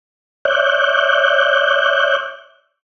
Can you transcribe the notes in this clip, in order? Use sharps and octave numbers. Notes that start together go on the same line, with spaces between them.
C#5 D5 E5 F#6 G6